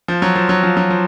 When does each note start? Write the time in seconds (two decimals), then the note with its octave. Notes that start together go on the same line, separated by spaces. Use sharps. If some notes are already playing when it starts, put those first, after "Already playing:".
0.08 F3
0.22 F#3
0.36 F3
0.49 F#3
0.63 F3
0.77 F#3
0.90 F3